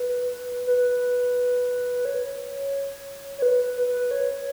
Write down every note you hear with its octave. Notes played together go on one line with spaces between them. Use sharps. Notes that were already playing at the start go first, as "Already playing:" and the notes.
Already playing: B4
B4
C#5
C#5
B4
B4
C#5